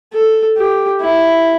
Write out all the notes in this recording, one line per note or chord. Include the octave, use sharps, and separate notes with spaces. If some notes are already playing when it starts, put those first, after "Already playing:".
A4
G4
E4